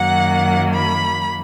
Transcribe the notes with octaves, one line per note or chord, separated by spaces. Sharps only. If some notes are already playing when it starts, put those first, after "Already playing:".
Already playing: F#2 D#3 F#3 A#3 F#5
B5